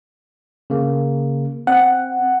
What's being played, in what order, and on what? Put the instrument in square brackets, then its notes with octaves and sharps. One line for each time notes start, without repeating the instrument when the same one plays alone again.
[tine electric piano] C#3 A#3
[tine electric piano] C4 [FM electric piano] F#5